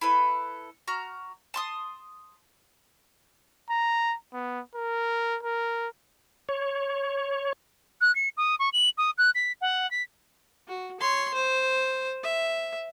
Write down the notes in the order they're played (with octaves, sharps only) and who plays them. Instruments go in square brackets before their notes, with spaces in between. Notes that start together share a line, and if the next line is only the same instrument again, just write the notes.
[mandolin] E4 A4 B4
F#4 A#5 F6
A5 C6 D#6
[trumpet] A#5
B3
A#4
A#4
[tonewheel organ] C#5
[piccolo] F#6
C#7
D#6
C#6
F#7
D#6
F#6
B6
F#5
B6
[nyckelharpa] F#4
C#5 C6
C5
E5